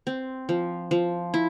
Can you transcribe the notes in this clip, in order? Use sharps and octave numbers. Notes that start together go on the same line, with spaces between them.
C4
F3
F3
E4